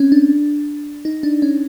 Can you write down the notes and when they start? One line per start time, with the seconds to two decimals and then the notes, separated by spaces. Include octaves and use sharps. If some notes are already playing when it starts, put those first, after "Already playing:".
Already playing: C4 C#4
0.12 D4
1.05 D#4
1.23 D4
1.42 C#4